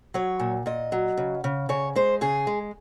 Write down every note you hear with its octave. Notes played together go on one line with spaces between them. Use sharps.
F#3 C#5
A#2
A#2 D#5
F#3
C#3
C#3
C#3 C#5
G#3 C5
C#3 G#4
G#3